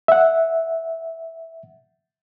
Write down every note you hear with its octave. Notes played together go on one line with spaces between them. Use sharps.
E5 F#5